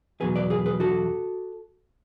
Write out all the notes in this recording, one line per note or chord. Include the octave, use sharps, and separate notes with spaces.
E2 B2 F#3 G#4 B4
B4 D5
G#4 B4
G#4 B4
F#4 A4